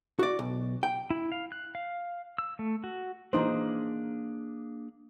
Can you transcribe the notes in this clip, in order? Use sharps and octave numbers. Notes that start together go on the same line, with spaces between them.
F#4 D5
B1
G5
E4
F5
F#6
F5
E6
A3
F#4
E3 A#3 D4 D#4 G#4 C5